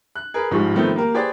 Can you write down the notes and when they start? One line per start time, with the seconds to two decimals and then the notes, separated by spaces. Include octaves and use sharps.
0.16 F#6
0.34 G#4 A#4 B4
0.51 A1 G#2 F3 G3 C#6
0.74 D#3 F3 A3 B3 C4
0.96 A#3 G4 A#4
1.14 G4 G#4 B4 C5 D5 G5